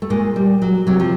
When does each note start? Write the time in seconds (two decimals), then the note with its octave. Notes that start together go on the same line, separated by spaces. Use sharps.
0.02 A3
0.10 A#2 G#3
0.36 G3
0.62 F#3
0.87 C3 F#3
1.00 F3